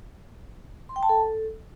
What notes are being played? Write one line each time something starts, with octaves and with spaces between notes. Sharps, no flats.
C6
G5
A5
A4